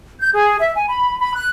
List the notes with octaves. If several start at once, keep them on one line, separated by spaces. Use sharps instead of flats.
G6
G#4
E5
G#5
B5
B5
F#6